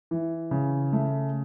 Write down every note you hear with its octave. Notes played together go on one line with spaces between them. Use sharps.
E3
C#3
A3